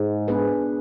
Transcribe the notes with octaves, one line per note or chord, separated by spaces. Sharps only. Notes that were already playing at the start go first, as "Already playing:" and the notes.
Already playing: G#2
B3 D4 G#4 B4